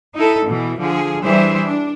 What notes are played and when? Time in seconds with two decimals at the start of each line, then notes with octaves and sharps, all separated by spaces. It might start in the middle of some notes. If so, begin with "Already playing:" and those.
0.15 D#4 E4 A4
0.48 B2 E3
0.79 D3 F3 G#4
1.22 E3 G3 D4 G#4 C5 E5
1.63 D4